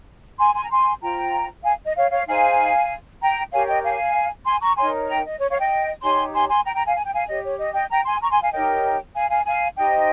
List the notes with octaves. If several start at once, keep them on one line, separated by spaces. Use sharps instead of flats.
G#5 C6
G#5 C6
A#5
G#5 C6
F4 C5 G5 A#5
F5 G#5
D#5
C#5 F5
C#5 F5
D#4 G#4 C5 F5 G#5
G5 A#5
G4 A#4 C#5 F5 G#5
D#5 G5
F5 G#5
G#5 C6
A#5 C#6
D#4 A#4 C#5 G#5 C6
G5 A#5
D#5
C#5
C#5 F5
D#5 G5
D#4 G4 C#5 G#5 C6
G#5 C6
G#5 C6
G5 A#5
G5 A#5
F5 G#5
G#5
G5
F5 G#5
G4 C#5 D#5
C#5
D#5
D#5 G5
G5 A#5
G#5 C6
A#5 C#6
G#5 C6
F5 G#5
D#4 G4 A#4 C#5 D#5 G5
F5 G#5
F5 G#5
F5 G#5
D#4 G4 C5 D#5 G5